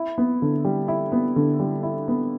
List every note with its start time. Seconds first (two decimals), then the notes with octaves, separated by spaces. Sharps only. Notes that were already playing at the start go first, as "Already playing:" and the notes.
Already playing: E4
0.18 B3
0.42 D3
0.65 G3
0.88 E4
1.12 B3
1.36 D3
1.60 G3
1.83 E4
2.08 B3